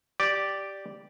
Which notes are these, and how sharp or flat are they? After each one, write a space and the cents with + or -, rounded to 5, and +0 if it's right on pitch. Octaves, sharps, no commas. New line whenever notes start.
G4 +0 D5 +0